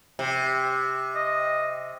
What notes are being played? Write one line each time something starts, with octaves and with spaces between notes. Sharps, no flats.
C3
D#5